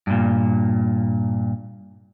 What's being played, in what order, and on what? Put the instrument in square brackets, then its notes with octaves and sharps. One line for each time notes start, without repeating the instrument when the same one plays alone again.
[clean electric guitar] G2 A#2